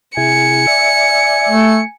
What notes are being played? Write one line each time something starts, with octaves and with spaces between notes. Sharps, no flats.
C3 E4 G#4 G#5 C#7
D5 E5
A3